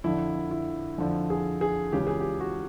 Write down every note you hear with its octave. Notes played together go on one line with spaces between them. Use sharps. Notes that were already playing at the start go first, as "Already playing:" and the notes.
F2 D3 F3 E4
E4
F2 D3 F3
G#4
G#4
C#2 C#3 E3 G4
G#4
G4
F#4